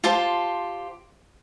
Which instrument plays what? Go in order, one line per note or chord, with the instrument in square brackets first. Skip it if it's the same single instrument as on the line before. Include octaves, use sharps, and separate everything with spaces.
[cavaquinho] F4 G4 C5 A5